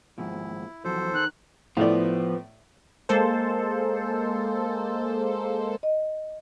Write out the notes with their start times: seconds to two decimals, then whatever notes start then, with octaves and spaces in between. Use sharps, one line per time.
0.18 D#2 G#2 F3 E4
0.85 F2 E3 F#3 A4 C5
1.14 D#3 F#6
1.77 A2 F3 B3 D5
3.09 G#3 A#3 A4 C5
5.83 D#5